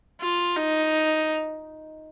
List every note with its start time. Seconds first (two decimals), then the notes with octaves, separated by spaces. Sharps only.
0.21 F4
0.57 D#4